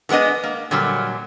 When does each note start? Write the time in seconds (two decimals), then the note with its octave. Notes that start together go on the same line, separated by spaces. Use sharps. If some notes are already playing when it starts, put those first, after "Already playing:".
0.09 E3 G#3 B3 D4 D#5
0.44 A#3
0.71 A#2 D3 F#3 G3